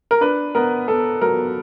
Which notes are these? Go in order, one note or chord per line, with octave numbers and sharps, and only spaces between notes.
A#4
D4 B4
B3 A#4
B3 A4
F#3 A#4